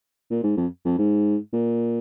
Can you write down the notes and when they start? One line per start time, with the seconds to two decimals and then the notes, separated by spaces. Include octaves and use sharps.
0.31 A#2
0.43 G#2
0.57 F2
0.85 F2
0.98 G#2
1.53 A#2